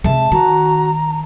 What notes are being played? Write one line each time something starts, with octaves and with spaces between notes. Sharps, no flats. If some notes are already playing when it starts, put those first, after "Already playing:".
C3 G#3 E5 A5
D#3 F#4 A#5